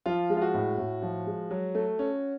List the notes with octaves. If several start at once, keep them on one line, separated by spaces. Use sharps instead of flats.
F3 F4
G#3
F4
F#4
A2
A2
F3
G#3
F#3
A3
C#4